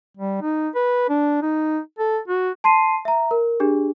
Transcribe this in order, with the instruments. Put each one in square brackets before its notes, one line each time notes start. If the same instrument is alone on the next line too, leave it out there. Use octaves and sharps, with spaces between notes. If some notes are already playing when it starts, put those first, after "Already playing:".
[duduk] G3
D#4
B4
D4
D#4
A4
F#4
[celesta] A5 C6 C7 D#7
E5 A#5
A#4
D4 G4 G#4